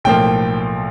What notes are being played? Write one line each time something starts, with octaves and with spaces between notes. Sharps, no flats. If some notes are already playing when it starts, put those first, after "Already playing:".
B1 A2 F3 A#3 G5